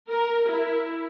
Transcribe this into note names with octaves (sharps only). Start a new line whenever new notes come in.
A#4
E4